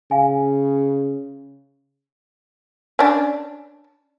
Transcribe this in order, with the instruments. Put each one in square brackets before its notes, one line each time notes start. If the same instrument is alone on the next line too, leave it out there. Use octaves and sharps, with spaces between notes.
[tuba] C#3 [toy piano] F5 G#5
[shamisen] C#4 D4